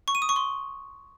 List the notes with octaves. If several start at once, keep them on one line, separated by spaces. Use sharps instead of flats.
C#6
D#7
D#6
C#6
C6